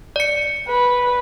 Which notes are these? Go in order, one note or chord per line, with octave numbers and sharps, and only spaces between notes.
D5 C#7
B4